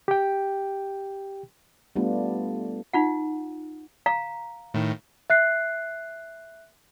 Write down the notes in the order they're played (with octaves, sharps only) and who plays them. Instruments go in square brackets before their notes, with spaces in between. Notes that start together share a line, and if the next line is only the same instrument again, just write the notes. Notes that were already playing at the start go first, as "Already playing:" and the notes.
[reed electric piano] G4 G5
[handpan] G3 A3 B3 D4 F4
[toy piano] D#4 F4 F#5
F5 A#5
[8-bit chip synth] A2 D#3
[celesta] E5 F#6 C7